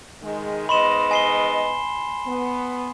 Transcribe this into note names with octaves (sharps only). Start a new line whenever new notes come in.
D#3 G#3
G#2 B3 D#5 B5 C6 E7
G#5 C7 G7
B3